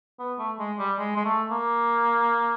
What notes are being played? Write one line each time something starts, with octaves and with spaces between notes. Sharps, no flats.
B3
A3
G#3
G3
G#3
G#3
A3
A#3